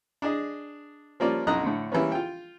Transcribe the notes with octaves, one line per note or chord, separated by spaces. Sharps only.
D4 G#4 D#5
F3 G3 A#3 C#4 F4 D5
B1 F#2 D#4 D#5 A#5 F#6
A2 D3
E3 G3 A#3 B3 C#4
F4 G5